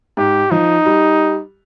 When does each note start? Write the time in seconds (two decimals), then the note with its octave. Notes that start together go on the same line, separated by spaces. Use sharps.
0.17 G#2 G4
0.51 F3 D#4
0.86 G3